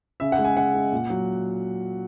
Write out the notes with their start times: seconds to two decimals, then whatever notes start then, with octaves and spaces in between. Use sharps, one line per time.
0.20 C#3 E5
0.32 F#5
0.38 G#3
0.45 G#5
0.56 C#3 F#5
0.74 G#3
0.92 A#2
1.10 F#3